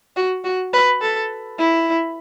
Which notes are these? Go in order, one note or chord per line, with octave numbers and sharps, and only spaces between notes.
F#4
F#4
B4
A4
E4